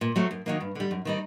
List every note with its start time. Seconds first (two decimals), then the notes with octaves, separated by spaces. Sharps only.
0.01 A#2
0.16 F#3 A3 C4
0.31 F#2
0.46 D#3 F#3 A#3 D#4
0.61 G2
0.75 D3 G3
0.91 F#2
1.05 D#3 G3 C4 D#4